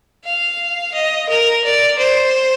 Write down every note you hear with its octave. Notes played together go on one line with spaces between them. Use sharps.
F5
D#5
A#4
D5
C5